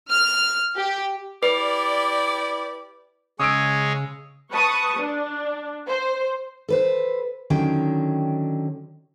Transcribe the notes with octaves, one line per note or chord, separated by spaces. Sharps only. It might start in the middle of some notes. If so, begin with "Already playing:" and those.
F6
G4
E4 G4 B4 D5
C#3 G#3 C#5 D#6 E6 D7
B4 A5 C#6 D#6
D4
C5
A4 B4 C5
D3 D#3 F#3 C#4 G5